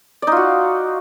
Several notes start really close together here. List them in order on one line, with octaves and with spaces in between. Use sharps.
D5 D#4 F4 F#4